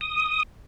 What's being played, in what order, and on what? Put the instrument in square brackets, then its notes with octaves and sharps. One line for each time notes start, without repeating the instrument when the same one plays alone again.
[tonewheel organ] D#6